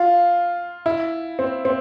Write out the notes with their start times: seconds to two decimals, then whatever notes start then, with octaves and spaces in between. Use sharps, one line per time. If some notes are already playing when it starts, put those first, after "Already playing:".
Already playing: F4
0.86 E4
1.39 C4
1.65 C4